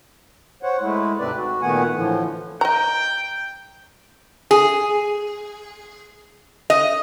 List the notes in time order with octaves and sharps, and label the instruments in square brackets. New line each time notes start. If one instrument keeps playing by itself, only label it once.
[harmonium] C5 C#5 F#5
G#3 A3 E4
D2 G#2 C3 C4 B4 D5
F#4
A#2 D#3 A3 B3 F#5 G#5
A2 D3 E3 F3
[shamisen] D#5 A#5 [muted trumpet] G5
[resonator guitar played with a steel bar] G#4
D#5